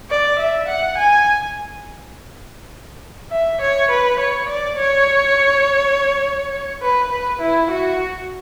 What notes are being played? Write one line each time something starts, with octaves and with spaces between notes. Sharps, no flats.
D5
E5
F#5
G#5
E5
C#5
B4
C#5
D5
C#5
B4
B4
E4
F#4